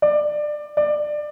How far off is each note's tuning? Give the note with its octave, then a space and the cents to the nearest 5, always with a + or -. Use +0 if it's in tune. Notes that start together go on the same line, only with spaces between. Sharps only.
D5 +20
D5 +20